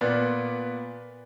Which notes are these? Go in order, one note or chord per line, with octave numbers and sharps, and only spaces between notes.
A#2 B3 B4 D5